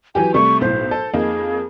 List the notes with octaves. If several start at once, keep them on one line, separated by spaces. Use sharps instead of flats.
E3 F#3 G4 G#5
C3 G3 A3 C#6
B1 A2 C5
A4
F2 A#3 D#4 G#4